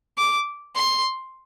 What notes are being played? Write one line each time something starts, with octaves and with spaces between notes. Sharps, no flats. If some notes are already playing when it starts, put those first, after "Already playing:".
D6
C6